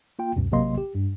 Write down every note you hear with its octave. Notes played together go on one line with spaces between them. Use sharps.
A#3 F4 G5
C#2 F#2 B2
A1 C3 F#3 A#3 D#5 C6
G4
G2